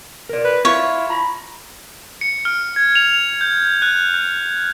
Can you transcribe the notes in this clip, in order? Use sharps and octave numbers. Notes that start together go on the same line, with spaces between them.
A#4 D5
B4
E4 F4 C#5
A#5 B5
C#7
F6
G#6
F7
G6
F#6
F#6